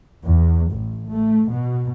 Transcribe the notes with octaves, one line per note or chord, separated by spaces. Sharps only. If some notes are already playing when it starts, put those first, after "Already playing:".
E2
A1
A3
B2